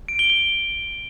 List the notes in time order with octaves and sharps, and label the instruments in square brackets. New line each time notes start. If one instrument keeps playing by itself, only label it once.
[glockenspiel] D7
G7
G7